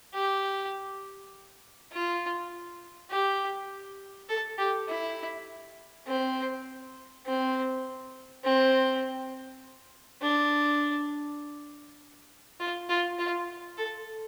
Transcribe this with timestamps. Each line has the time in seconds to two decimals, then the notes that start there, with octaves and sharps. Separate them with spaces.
0.13 G4
1.92 F4
3.10 G4
4.29 A4
4.58 G4
4.88 E4
6.06 C4
7.25 C4
8.44 C4
10.22 D4
12.60 F4
12.89 F4
13.19 F4
13.77 A4